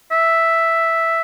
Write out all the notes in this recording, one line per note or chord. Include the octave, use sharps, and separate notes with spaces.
E5